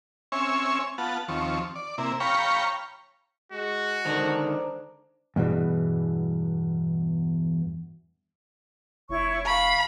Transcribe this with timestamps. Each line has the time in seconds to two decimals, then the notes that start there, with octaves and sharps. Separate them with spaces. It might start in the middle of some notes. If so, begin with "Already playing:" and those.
0.32 C4 C#4 C#5 E5 G#5
0.98 B3 F4 F#5 A5
1.28 D#2 F3 C4 C#6
1.76 D5
1.98 C3 A#3 E4
2.20 C#5 F5 G5 A#5 B5 C#6
3.52 G#3 F#4
4.05 D3 D#3 G#3 D4 C5 A#5
5.36 E2 G2 B2 E3
9.09 F1 E4 C#5 C#6
9.46 F5 B5 C#6